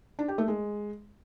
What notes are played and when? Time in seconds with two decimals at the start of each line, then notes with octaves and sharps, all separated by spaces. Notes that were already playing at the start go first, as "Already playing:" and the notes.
0.19 D4
0.28 G4
0.38 A3
0.48 G#3